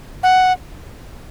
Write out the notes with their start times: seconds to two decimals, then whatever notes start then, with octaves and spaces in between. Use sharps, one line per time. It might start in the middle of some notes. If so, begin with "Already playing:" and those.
0.23 F#5